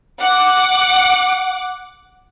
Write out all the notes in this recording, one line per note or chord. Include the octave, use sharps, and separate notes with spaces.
F#5 D6